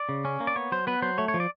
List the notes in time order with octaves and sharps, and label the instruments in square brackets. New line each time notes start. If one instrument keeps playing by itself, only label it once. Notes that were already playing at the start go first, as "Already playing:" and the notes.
Already playing: [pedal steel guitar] D5
C#3
C#4
A#3
D5
B3 C#5
F#3 C5
B3 B4
F#3 C5
A3 C#5
C#5
F3
D5